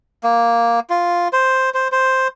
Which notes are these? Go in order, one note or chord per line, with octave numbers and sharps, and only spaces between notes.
A#3
F4
C5
C5
C5